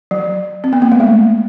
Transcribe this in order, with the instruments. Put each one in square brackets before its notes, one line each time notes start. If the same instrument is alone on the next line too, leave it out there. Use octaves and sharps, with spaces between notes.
[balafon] F#3
C4
B3
A#3
A3
G#3